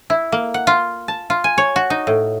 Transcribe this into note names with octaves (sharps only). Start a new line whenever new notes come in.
E4
A#3
F#5
F4
A5
F4
G#5
C#5
F#4
D#4
A2